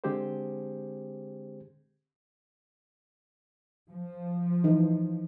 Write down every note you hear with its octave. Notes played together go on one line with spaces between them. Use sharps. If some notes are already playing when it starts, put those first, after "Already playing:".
D3 G#3 C4 G4 G#4 C5
F3
E3 D#4